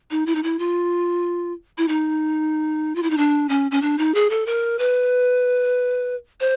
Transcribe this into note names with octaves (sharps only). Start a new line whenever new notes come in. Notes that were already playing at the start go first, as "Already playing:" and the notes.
D#4
E4
D#4
E4
F4
E4
D#4
F4
E4
D#4
D4
C#4
C#4
D4
D#4
G#4
A4
A#4
B4
C5